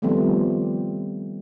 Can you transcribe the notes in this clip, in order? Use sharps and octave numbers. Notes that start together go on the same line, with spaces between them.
D#3 F3 G3 A3 B3 C4